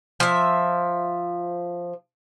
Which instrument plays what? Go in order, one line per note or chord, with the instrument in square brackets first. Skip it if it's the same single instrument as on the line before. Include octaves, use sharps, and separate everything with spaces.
[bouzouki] F3 E5